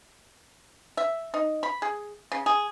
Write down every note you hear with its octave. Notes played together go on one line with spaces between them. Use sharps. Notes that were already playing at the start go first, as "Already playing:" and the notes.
E5
D#4
B5
G#4
C#3
G#4